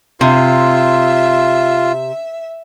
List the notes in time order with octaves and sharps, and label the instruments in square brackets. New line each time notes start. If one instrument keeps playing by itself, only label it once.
[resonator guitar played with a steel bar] C3 [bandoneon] F4 [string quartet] E5